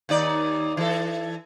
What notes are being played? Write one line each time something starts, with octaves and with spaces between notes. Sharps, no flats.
D#2 D#4 D5
E3 A4